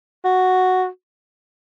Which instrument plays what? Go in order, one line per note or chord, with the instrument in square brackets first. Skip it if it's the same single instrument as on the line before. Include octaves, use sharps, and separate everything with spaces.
[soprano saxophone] F#4